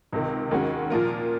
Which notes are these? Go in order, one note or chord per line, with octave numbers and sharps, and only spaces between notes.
C#2 C3 D#3
D#2 D#3 G#3 C#4 F#4
A#2 F3 A#3 F4 A#4